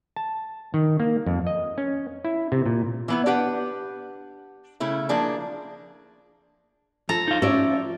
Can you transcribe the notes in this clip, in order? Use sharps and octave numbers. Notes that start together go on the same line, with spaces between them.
A5
D#3
A#3
F2
D#5
C#4
E4
C3
A#2
E3 B3 E4
D4 G4 B4 F#5
C#3 A3 E4
F3 A#3 D4 G#4
F3 A4 A#5
D#4 F5
C#4 D5 E5